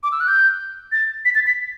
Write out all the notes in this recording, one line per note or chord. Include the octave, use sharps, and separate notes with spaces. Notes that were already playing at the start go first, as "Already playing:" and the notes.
D6
E6
F#6
G6
A6
B6
A6
B6